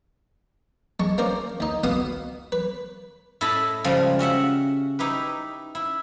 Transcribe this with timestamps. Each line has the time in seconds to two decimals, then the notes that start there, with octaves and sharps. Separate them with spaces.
1.00 G#3 A5 C#6
1.18 A#3 C#4 A#4 C5 D5
1.60 D#2 D#4
1.83 C#2 B2 B3 F5 F#5 D#6
2.52 B4
3.41 A2 E4 D#5 A5 B5
3.84 C#3 F3 G3 G#3
4.19 C#4 F#4 E5 F#5
4.99 D#4 E4 G4 B4
5.75 E4